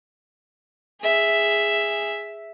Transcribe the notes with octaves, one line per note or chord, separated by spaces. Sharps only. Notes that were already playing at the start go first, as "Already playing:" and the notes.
G#4 E5